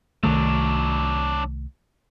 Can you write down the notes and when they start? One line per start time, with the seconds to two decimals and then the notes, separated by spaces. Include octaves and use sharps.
0.23 C2 D#3 F#3 A3 D4